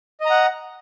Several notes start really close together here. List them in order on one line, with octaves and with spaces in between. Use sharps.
D#5 A#5 F#5